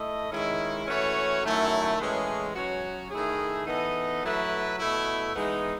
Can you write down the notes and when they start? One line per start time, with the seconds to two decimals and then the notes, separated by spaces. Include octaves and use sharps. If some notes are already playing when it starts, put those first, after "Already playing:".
Already playing: A3 E4 A4 D#5
0.30 D#3 G#3 C#4 E4
0.86 E3 A3 C#4 F#4 C#5
1.43 F#2 D#3 A3 E4
1.99 A2 E3 G#3 C#4
2.54 F#3 C#4 F#4 C#5
3.11 D#3 A3 E4 G#4
3.66 E3 B3 D#4 A4 D#5
4.23 F#3 A3 E4 B4
4.79 B2 A3 E4
5.35 E3 G#3 B3 D#4